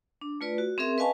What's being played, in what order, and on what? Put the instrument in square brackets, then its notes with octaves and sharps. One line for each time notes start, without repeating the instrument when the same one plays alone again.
[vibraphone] D4
A3 F4 B4 D5
F#4
C4 C#4 G#4 A#4 E5 C6
B4 D#5 F5 G#5 A5 C#6